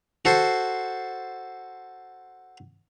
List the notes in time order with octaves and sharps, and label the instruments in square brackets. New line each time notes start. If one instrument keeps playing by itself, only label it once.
[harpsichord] F#4 A4 C5